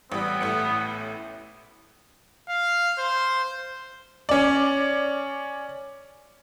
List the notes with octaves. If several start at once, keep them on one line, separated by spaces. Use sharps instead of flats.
A1 G3 B3
A1 A2 C#7
F5
C5
C#4 D5